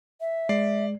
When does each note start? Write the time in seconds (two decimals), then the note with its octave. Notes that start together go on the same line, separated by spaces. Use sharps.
0.21 E5
0.49 G#3 D5 C7